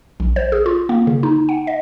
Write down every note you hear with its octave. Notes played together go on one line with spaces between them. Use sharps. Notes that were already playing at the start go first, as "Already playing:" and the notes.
A#1
C5
G#4
F4
A#3
C#3
D#4
F#5
D#5